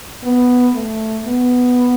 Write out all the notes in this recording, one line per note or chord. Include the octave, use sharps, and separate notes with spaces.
B3
A3
B3